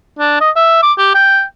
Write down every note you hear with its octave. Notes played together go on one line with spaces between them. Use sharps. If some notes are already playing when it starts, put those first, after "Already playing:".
D4
D#5
E5
D6
G4
G5